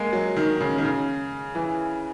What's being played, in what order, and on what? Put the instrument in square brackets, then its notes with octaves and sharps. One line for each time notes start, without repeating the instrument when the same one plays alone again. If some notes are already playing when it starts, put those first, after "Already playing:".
Already playing: [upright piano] G#3 A#3
F#3
D#3
C#3
D#3
C#3
E3